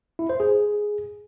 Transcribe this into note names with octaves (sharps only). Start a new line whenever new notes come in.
E4
C5
G#4